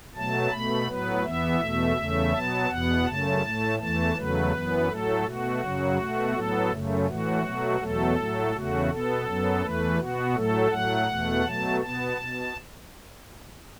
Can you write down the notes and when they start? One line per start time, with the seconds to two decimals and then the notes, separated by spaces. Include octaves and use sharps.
0.15 B2 F#3 A3 A5
0.51 B2 A3 B5
0.87 A2 F#3 B3 B4
1.24 E2 E3 B3 E5
1.60 E2 B2 A3
1.96 E2 C#3 A3
2.33 B2 F#3 B3 A5
2.70 E2 B2 B3 F#5
3.06 F#2 C#3 A3 A5
3.42 A2 A3
3.79 E2 E3 A3 A5
4.16 E2 C#3 F#3 A3 B4
4.52 F#2 E3 B3
4.88 A2 F#3 A3 A4
5.24 B2 A3 F#4
5.61 F#2 C#3 F#3
5.98 B2 A3
6.34 A2 F#3 B3 A4
6.70 F#2 C#3 A3
7.07 A2 E3 A3 F#4
7.43 B2 F#3 A3
7.80 E2 B2 F#3 A3 A4
8.16 A2 F#3 A3
8.52 E2 C#3 A3 F#4
8.89 B2 B3 A4
9.26 F#2 F#3 B3
9.62 E2 E3 A3 B4
9.98 B2 B3 F#4
10.35 A2 F#3 A3 A4
10.71 A2 F#3 A3 F#5
11.08 E2 B2 A3
11.45 B2 F#3 A3 A5
11.81 B2 B3 A5
12.17 B2